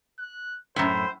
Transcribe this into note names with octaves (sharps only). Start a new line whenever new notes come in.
F#6
F#2 A2 C5